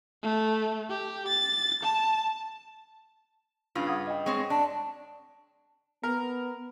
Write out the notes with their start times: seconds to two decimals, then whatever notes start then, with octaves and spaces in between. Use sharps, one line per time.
0.24 A3
0.90 G4
1.28 A6
1.84 A5
3.75 G2 C#3 F4
3.87 F#5 D#6 G#6
4.07 D#5 G5
4.26 G#3 C4 C#5 C#6
4.50 D4 A5
6.03 B3 A#4